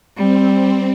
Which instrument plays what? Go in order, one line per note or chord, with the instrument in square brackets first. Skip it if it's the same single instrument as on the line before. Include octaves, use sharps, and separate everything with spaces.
[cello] G3 [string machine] C4
[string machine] C4